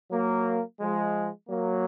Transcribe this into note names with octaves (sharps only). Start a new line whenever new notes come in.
F#3 A#3
F3 G#3
F#3 A#3